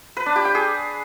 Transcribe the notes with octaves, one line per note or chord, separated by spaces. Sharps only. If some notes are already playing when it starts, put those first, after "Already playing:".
B4
D4
G4
G5
G#4